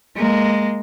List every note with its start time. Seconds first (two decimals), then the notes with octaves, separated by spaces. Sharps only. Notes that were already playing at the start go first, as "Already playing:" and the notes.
0.16 G#3 A#3